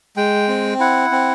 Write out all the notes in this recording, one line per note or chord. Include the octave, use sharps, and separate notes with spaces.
G#3 G5
C4
E4 F#5
C4